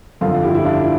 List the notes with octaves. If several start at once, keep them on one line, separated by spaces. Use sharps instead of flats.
G1 F2 D3 F4 A4
E4 G4
E4
D4 F4